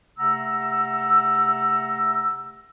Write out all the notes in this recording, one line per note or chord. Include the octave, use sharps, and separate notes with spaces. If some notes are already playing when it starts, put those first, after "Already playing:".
C3 A3 F#5 A#5 E6